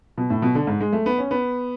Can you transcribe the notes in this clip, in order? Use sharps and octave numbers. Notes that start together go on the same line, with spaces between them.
B2
A2
B2
D3
G#2
G#3
A3
B3
C#4
B3